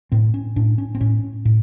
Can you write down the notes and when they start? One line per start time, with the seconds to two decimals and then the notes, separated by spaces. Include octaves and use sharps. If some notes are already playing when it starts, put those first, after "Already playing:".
0.12 A2 C4
0.34 C#4
0.56 A2 D4
0.78 C#4
0.95 C4
1.01 A2 C#4
1.45 A2